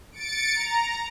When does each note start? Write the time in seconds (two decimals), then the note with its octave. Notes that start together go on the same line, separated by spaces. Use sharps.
0.12 A6 C#7 D7
0.55 A#5